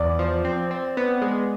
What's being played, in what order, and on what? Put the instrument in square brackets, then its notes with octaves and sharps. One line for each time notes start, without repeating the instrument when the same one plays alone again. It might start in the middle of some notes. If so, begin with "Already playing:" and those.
Already playing: [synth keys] E2 [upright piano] D5
[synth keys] F3
C4
C4
B3
G#3